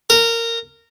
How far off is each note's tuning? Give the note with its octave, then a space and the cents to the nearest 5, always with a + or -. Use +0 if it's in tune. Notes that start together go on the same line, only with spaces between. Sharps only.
A#4 -15